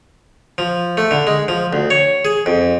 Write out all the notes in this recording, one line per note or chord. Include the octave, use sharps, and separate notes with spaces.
F3
A3
D3
G#3
F3
D2
C#5
G#4
F2